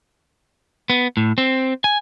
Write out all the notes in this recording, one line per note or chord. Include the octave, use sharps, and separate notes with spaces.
B3
A2
C4
G#5